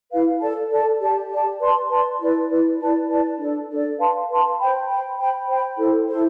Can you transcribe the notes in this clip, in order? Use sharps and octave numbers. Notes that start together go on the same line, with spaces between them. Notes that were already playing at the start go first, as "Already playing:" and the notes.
E4 B4 F5
A4 D5 A5
A4 D5 A5
G4 D5 A5
G4 D5 A5
B4 D5 A5 C6
B4 D5 A5 C6
E4 B4 D5
E4 B4 D5
E4 B4 D5 A5
E4 B4 D5 A5
D4 A4 D5
D4 A4 D5
B4 F5 A5 C6
B4 F5 A5 C6
C5 G5 B5
C5 G5 B5
C5 G5 B5
C5 G5 B5
E4 A4 C5
E4 A4 C5